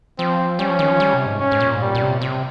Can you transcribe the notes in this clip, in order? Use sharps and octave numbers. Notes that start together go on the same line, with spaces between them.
F3 C4
G3 C#4
F3
D#3
F3
G3
C3
G#2
C#4
G#2
A#2
G#2
A#2 G3
A#2
C3
A#2
C3